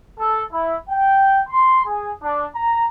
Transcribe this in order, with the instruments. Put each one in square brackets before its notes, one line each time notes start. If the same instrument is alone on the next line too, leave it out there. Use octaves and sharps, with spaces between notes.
[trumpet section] A4
E4
G5
C6
G#4
D4
A#5